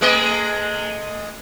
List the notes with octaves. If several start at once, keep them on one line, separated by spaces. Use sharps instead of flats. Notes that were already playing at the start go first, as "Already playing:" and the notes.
G#3 A3 D#5